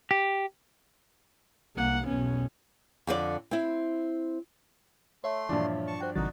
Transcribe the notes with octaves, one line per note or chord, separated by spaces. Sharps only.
G4
C2 A#3 F#5
B1 E2 B2 B3 C#4
F2 D3 A4 D5
C4 E4
A3 C#5 E5 C6
G2 A#2 E3 F3 D4
A5 C#6
F#4 C5 G5
A1 A2 C3 D#3 F#3 D#4 F#4 A6